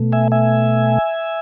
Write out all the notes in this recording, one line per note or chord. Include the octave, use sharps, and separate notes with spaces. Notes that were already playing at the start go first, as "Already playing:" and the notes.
Already playing: B2 A3
E5 G#5
E5 G#5